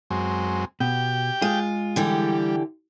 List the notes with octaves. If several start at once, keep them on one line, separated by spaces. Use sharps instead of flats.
F#2 G#3 C4
B2 G4 G5
G#3 F4 G#4
D3 E3 G3 G4